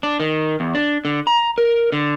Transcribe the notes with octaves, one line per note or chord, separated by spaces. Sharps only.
D4
D#3
E2
D4
D3
A#5
A#4
D3